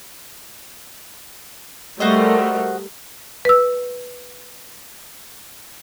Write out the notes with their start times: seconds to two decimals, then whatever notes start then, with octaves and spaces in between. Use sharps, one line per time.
2.00 G3 A3 F#4 A#4 C5 D#5
3.45 B4 E6